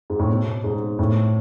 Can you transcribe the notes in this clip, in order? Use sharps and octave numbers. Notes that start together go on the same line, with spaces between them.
G#2
A2
B2
G#2
A2